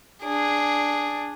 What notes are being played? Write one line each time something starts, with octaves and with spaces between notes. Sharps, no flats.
D4 G#4